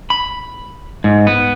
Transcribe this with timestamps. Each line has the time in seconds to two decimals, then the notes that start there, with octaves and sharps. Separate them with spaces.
0.10 B5
1.04 G#2
1.27 B3